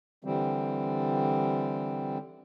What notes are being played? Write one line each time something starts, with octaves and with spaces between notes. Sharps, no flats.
D3 E3 G3 C4